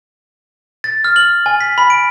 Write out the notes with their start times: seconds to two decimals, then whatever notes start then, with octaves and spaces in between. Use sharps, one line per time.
0.84 A6
1.04 F6
1.16 F#7
1.46 G#5
1.61 B6
1.78 B5
1.90 D7